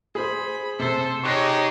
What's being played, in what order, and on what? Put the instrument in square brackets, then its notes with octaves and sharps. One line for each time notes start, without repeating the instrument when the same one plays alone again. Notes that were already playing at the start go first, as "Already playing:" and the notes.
[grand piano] G#4 C5 [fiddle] B5
[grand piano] C3 [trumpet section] A4 [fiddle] C5
[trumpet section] D#4 G4 [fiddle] G#4 C#5 [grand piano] C#6 F#6 A#6